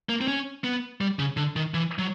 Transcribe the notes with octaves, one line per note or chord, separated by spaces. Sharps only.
A#3
C4
C#4
B3
G3
C#3
D3
D#3
E3
F#3